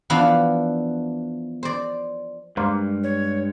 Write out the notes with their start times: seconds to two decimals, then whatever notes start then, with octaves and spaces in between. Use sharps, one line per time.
0.10 E3 F3 B3 D4 B4 F5
1.63 C5 D5
2.57 G2 G#3 A#3 C5 D5
3.03 C#5